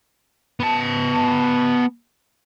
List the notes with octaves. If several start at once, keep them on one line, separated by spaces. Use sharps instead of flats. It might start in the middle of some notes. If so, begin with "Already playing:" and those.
B3 A5